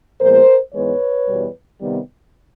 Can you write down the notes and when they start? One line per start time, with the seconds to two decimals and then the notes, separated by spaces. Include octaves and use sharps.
0.21 A#2 F3 G#3 B3 A#4 C5
0.74 G#2 E3 G#3 B3 B4 C#5
1.28 E2 B2 G3 B3
1.81 C3 D#3 G3 B3